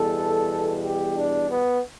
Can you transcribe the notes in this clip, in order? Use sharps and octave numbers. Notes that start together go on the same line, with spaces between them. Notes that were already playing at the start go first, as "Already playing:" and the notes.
Already playing: E2 B2 G3 A4
G4
D4
B3